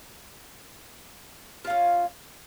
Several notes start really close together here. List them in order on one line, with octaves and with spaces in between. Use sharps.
F4 F5 C#4